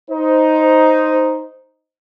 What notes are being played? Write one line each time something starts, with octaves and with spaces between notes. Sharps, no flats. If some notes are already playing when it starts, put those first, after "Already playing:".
D#4 C5